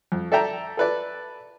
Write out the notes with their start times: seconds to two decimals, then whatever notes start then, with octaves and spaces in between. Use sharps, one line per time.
0.12 F2
0.32 A4 D5 E5 G5 A#5
0.77 A4 B4 D5